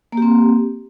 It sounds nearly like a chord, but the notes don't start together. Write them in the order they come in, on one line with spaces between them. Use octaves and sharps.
A#3 G4 C4